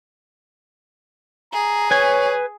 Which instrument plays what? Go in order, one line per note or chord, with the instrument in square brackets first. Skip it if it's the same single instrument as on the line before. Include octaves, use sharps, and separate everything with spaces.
[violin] G#4 [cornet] A#5
[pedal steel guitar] B4 G#5 [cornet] C#5